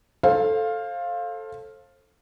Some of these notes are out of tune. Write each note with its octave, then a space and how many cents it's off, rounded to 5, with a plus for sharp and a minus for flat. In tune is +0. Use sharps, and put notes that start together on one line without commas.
A4 +0 C5 +30 F5 +0